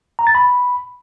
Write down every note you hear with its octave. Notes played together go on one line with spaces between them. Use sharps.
A#5
A6
B5